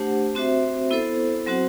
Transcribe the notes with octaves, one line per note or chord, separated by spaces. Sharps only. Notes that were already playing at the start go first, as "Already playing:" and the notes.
Already playing: A3 D4 G4 C5 F#5
C4 F#4 C5 E5
B3 E4 A4 C5
F#3 C4 F#4 C5 F#5